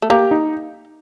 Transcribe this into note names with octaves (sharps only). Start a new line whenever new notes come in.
A3
A#3 G4
D#4